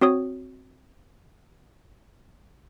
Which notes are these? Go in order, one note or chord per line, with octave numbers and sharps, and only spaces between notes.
C4 F#4 C#5 D#6